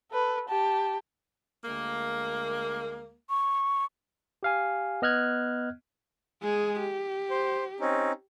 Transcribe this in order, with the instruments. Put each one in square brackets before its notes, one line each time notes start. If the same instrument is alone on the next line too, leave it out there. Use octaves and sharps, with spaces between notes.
[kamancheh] A4 B4
G4 A5
[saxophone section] D2 G#3 A#3
[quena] C#6
[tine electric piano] G4 F5 G#5
B3 D#5 F6 F#6 G#6
[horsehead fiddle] G#3 G#4
G4
[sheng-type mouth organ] C5
C4 C#4 D#4